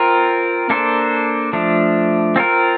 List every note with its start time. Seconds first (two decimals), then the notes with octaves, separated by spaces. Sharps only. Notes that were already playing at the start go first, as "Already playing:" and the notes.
Already playing: C4 F4 A#4
0.70 A#3 D4 A4 C5
1.53 F3 A3 D4
2.36 C4 F4 A#4